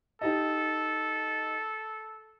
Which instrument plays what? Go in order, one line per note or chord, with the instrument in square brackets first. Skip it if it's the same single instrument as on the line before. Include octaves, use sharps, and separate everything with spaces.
[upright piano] D#4 G4 D#5 [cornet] A4